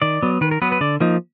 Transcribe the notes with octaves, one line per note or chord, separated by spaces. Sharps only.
D#3 D5
F#3 B3
D#3 B4
A#4
F#3 B3 B4
B4
D3 D5
F3 A#3 D#4